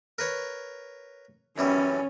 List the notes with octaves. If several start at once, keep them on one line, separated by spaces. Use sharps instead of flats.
A#4 B4 C#5
F#2 E3 G3 C#4